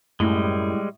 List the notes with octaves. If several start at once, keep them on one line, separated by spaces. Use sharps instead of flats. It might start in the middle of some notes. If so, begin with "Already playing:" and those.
F#2 A2 G3 G#3